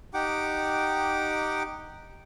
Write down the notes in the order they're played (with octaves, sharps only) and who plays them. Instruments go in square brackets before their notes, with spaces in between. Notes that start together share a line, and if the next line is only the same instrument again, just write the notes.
[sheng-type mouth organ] D#4 G4 F#5 G5 D6